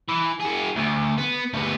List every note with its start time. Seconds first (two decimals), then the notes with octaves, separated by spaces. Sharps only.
0.09 E3
0.41 F#4 G#4
0.76 D2
1.18 B3
1.54 D2 B3